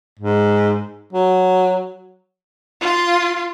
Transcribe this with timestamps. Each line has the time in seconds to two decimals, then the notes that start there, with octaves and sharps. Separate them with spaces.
0.20 G#2
1.13 F#3
2.81 F4 C6